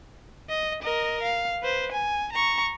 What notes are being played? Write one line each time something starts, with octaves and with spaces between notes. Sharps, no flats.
D#5
A#4 D#5
F5
B4 C5
G#5
A#5 C#6